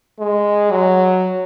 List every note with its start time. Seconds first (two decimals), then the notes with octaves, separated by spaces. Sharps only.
0.19 G#3
0.71 F#3